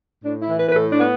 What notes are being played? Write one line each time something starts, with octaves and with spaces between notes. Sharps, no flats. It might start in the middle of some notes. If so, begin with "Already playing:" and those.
A2 D4
E4
E3
B4
B4
A2 A4
D4
B3